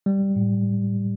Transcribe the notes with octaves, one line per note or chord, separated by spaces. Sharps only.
G3
A2